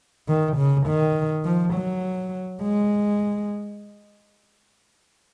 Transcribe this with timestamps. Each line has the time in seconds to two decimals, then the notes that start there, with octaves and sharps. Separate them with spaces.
0.28 D#3
0.57 C#3
0.87 D#3
1.45 F3
1.74 F#3
2.62 G#3